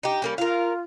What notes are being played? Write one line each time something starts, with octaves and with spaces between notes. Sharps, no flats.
D#4 G4
G3 A#3 C#4
F4 A#4 F5